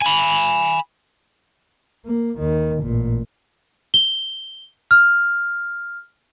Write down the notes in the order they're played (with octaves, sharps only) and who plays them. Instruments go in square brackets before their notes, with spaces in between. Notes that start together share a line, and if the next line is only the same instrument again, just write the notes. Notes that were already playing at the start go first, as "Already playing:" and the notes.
[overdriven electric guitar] G#5 B5
[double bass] A#3
D#2 D#3
A1 A#2
[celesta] G7
F6